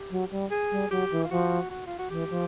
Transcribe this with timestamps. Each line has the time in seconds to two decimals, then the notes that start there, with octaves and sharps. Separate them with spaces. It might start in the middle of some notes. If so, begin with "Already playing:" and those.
Already playing: G4
0.11 F#3
0.31 G3
0.51 G#4
0.71 G3
0.91 F#3 G4
1.11 E3
1.24 F4
1.31 F3 F#4
1.70 F#4
1.86 F4
1.99 F#4
2.10 E3 G4
2.30 F3